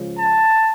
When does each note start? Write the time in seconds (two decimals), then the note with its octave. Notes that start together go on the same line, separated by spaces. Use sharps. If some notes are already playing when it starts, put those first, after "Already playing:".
Already playing: C#2 C#3 F3
0.18 A5